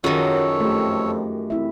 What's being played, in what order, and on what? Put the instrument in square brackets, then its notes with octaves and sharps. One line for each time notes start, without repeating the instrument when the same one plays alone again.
[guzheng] F#2 D#3 [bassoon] F#3 [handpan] F4 G#4 [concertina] A4 C#5
[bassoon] F2 [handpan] A3 G4
[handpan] C4 E4 E5